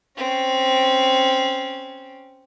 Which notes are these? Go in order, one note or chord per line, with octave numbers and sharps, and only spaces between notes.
C4 C#4